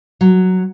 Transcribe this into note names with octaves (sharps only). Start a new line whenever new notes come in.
F#3